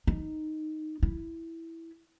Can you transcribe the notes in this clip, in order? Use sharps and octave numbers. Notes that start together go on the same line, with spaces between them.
D#4
E4